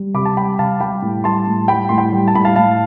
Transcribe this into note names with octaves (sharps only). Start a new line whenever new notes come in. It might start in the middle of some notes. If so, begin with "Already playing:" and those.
Already playing: G3
C3 B5 D6
A5
G3 G5 B5
C3 F5 A5
G3 G5 B5
A2
G3 A5 C6
A2
G3 G5 B5
A2 C6
G5 B5
G3
A5
A2 B5
F5 A5
A2 F5 A5